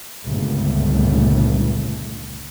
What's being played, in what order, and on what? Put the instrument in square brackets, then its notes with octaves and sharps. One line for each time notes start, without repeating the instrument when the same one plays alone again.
[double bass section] G1 C#2 G2 A#2 C#3 A3